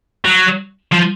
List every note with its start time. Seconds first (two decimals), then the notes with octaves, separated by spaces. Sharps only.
0.25 F#3
0.92 F3